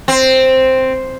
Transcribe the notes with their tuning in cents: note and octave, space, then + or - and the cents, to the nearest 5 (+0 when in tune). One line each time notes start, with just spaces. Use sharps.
C4 +0